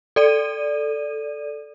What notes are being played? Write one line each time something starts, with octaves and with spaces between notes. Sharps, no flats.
A4 D5 D#7